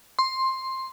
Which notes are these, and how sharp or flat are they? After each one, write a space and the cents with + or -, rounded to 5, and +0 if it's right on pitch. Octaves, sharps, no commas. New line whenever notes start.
C6 +10